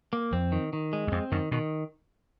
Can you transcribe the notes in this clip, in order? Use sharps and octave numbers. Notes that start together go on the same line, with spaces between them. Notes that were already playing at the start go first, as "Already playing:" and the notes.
A#3
F2 C4
D#3
D#3
G#3
E2
F2 C4
F#2 D#3
B2 D#3